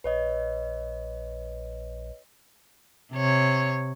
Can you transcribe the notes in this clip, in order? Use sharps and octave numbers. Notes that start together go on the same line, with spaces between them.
A#1 B4 C#5 D#5
C3 C#5